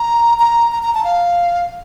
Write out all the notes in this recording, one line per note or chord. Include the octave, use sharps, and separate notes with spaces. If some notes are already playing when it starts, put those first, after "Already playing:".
Already playing: A#5
A#5
A#5
A#5
A5
F5